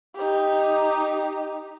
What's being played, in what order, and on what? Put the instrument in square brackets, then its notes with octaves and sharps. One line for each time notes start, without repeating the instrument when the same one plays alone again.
[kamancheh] D#4 G4